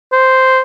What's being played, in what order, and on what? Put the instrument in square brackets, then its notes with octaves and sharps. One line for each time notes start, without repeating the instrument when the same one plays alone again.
[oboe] C5